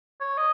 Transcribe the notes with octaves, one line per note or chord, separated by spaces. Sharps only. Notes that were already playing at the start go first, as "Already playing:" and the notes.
C#5
D#5